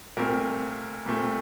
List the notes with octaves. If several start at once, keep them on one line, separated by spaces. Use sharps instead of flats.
C2 A#2 A3 C4 A#4
C2 A#2 A3 C4